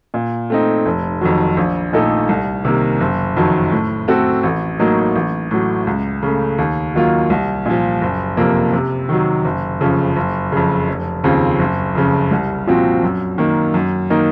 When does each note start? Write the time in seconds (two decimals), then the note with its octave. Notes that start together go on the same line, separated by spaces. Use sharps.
0.14 A#2
0.50 A3 C4 D#4
0.86 F1
1.21 F2 D#3 F#3
1.57 A#1
1.93 A#2 A3 D#4 A4
2.29 C2
2.65 C3 D#3 A#3
3.00 F#1
3.36 F2 D#3 F#3
3.72 A2
4.08 A3 C4 F#4 A4
4.43 A1
4.79 A2 F#3 A#3 D#4
5.16 A1
5.51 A2 F#3
5.87 C#2
6.22 C#3 A3
6.58 D#2
6.94 D#3 F#3 A#3 F4
7.30 C2
7.66 A#2 F3
8.01 F#1
8.37 F2 C3 F3 A#3
8.73 C3
9.09 D#3 F#3
9.45 F#1
9.81 F2 C#3 F3
10.16 F#1
10.52 F2 C#3
10.88 F1
11.24 D#2 C#3 F3 C4
11.59 F#1
11.95 F2 C#3
12.31 C2
12.67 A#2 F3 C4 F#4
13.02 F#2
13.38 D#3 A#3
13.74 F#2
14.10 D#3 A#3 D#4